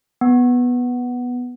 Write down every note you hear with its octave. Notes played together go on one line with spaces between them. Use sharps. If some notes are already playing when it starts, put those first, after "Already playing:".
B3